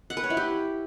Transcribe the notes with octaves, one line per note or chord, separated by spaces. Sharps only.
F#5
B4
C#5
E4
G4